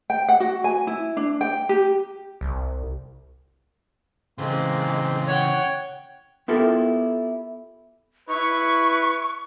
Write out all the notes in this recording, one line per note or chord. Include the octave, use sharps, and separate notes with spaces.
G5
F#5
F#4
G#5
E4
D4
G5
G4
C2
C#3 E3 G#3 A#3 C4 C6
C#5 F#5 G5
B3 E4 F4 G4 A4 A#4
E4 B4 C#6